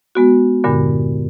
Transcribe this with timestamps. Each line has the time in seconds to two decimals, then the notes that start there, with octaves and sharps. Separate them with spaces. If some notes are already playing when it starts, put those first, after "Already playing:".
0.15 G#3 B3 F#4
0.64 E2 G2 A#2 D3